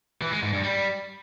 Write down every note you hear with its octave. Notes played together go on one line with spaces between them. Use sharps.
E3
G#3
G#2
G2
G3